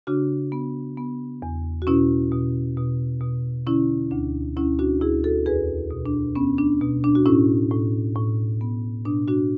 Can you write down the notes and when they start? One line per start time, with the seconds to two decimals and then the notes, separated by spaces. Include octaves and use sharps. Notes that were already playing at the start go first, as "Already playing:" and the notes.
0.07 C#3 D4 F#4
0.52 B3
0.97 B3
1.42 E2
1.82 F#4
1.87 B2 C#4 E4
2.32 B2
2.77 B2
3.21 B2
3.66 D3 C#4 E4
4.11 D2 D4
4.57 D2 C#4 E4
4.79 D4 F#4
5.01 D2 E4 G#4
5.24 F#4 A4
5.46 E2 G#4 B4
5.91 B2
6.06 D4
6.35 B3 C#4
6.58 D4
6.81 B2
7.04 D4
7.15 F#4
7.26 A2 C#4 E4
7.71 A2
8.15 A2
8.61 B3
9.05 B2 D4
9.28 D4 F#4